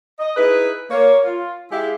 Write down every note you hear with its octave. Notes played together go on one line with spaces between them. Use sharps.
D#5
D#4 E4 G#4 B4
A#3 C#5
F4
G#3 E4 G4 G#4 E5 F5